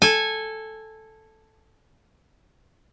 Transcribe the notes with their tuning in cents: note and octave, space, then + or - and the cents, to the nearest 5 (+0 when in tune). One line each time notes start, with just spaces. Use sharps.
A4 +0 G#5 -15